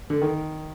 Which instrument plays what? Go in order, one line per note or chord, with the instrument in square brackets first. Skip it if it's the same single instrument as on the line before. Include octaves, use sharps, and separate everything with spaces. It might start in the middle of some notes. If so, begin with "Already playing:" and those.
[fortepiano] D3
D#3